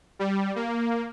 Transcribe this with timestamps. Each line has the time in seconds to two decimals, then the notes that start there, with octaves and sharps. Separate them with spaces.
0.19 G3
0.56 A#3